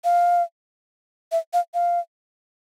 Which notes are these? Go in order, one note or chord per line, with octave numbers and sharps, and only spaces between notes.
F5
E5
F5
F5